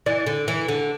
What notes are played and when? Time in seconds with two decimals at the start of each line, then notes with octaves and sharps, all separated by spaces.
0.06 E3 D5
0.27 D3
0.48 E3
0.68 D3